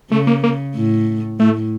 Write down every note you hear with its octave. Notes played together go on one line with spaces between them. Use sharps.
C#3 A3
A#3
A#3
A2
A2 A3